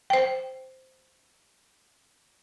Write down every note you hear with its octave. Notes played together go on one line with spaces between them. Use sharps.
C5 G5